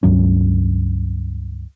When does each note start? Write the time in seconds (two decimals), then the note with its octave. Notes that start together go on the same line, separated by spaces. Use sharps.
0.03 C#2 G2 F#3 C#4